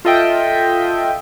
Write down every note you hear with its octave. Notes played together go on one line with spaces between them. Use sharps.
F4 A4 D#5 E5 G5